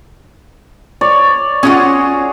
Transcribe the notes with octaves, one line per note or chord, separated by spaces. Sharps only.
C#5 D5
C#4 F4 F#4 G#4 F#5